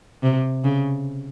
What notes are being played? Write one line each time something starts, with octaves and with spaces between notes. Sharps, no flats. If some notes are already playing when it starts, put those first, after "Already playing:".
C3
C#3